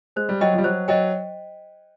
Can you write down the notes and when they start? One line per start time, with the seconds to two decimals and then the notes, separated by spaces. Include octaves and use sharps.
0.16 G#3 C5
0.29 G3
0.41 F#3 D#5 G5
0.53 F3 G3
0.64 F#3 C5
0.88 F#3 D#5 G5